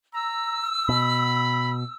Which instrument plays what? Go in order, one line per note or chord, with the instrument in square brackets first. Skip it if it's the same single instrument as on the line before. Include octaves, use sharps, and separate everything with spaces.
[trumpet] A#5 [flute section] E6
[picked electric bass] B2 [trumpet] B5